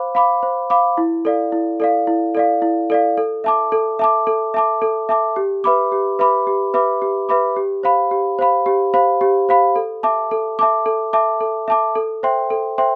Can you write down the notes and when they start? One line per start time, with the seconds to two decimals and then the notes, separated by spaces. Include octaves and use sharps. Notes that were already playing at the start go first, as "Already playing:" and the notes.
Already playing: C5 F5 B5 D6
0.15 F5 B5 D6
0.43 C5
0.70 F5 B5 D6
0.97 E4
1.25 A4 D5 F5
1.52 E4
1.80 A4 D5 F5
2.07 E4
2.35 A4 D5 F5
2.62 E4
2.90 A4 D5 F5
3.17 A4
3.44 E5 A5 D6
3.72 A4
3.99 E5 A5 D6
4.27 A4
4.54 E5 A5 D6
4.82 A4
5.09 E5 A5 D6
5.36 G4
5.64 B4 E5 B5 D6
5.92 G4
6.19 B4 E5 B5 D6
6.47 G4
6.74 B4 E5 B5 D6
7.02 G4
7.29 B4 E5 B5 D6
7.56 G4
7.83 C5 F5 B5
8.11 G4
8.39 C5 F5 B5
8.66 G4
8.94 C5 F5 B5
9.21 G4
9.49 C5 F5 B5
9.76 A4
10.03 E5 A5 D6
10.31 A4
10.59 E5 A5 D6
10.86 A4
11.13 E5 A5 D6
11.40 A4
11.68 E5 A5 D6
11.95 A4
12.23 C5 E5 G5 C6
12.50 A4
12.78 C5 E5 G5 C6